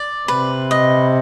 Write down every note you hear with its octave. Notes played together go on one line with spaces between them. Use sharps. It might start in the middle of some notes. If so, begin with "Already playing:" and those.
Already playing: D5
C3 B4
D#5